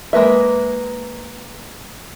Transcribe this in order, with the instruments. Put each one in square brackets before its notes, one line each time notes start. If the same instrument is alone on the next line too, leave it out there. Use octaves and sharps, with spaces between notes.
[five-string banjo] G#3 A#3 B4 E5